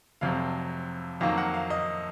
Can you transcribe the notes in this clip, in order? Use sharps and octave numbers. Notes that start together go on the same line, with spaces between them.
F1 F2 C3 F#3 F5
F2 D#3 F#3 A#3 F5
F#5
F5
D#5